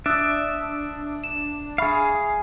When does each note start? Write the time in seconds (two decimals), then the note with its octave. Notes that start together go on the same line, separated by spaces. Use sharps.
0.06 D4 D5 E5 D#6 E6 F#6
1.24 E7
1.78 G#4 E5 F5 B5 C#6